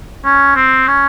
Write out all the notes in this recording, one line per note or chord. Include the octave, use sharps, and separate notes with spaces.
C#4
C4
C#4